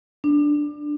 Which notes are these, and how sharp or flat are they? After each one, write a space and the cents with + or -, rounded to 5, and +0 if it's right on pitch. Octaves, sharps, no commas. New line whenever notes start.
D4 +5